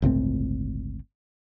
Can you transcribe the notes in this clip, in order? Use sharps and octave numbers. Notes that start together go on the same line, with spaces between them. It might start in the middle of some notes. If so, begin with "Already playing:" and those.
G1 C#2 A2 C4